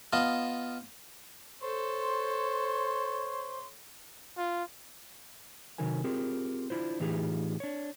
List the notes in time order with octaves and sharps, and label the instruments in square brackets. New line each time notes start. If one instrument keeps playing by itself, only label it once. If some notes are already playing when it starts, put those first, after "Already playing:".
[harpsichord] B3 F4 D#5 F5 A5
[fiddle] A4 [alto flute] C5 [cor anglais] C#5 [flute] C6
[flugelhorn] F4
[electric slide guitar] C3 D#3 F#3 D#4 A#4 G#5
C4 F4 G4 G#4 A#4
D4 E4 F4 C5
A2 E3 D#4 F4 G4 G#4
D4 C#5